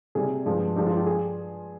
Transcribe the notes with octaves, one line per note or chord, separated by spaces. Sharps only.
C3 G3 G#4
G2 F3 G#3
G2 F3 G#3 G4
F4
G4
G#4